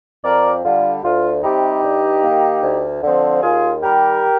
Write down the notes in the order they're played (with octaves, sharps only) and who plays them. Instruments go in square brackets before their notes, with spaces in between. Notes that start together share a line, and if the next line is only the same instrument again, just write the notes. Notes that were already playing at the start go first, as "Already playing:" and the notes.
[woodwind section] F2 A#4 D5
D3 G3 F4
D2 F4
C3 G3 C4 D#4 G4
G2
D#3 A#3
D2
D3 F3 C4
D#2 F4 G#4
D#3 G3 G4 A#4